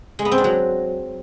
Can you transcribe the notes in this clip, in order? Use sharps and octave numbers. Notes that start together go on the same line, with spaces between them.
G#3
B3
C4
D4
F#3